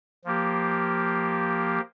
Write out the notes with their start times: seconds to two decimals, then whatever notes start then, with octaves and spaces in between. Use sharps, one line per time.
0.25 F3 A#3 G4